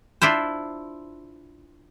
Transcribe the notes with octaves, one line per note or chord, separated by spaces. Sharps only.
D4 E4 F4 C5